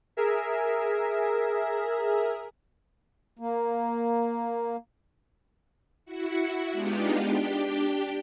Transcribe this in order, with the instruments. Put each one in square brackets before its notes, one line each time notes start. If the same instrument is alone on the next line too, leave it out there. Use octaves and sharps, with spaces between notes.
[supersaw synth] G#4 A#4 E5
[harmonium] A#3
[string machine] E4 F#4 C#7
G#3 B3 D4 D#4 F4 G4
D4 G4 G5